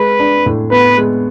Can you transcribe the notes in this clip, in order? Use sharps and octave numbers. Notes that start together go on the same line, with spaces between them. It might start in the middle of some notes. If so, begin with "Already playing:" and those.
Already playing: G#3 B4
D4
A2
B3 B4
G#3